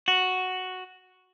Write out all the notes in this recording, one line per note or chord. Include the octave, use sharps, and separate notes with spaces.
F#4